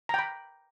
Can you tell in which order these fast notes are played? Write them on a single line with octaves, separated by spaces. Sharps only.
A#5 G5 B5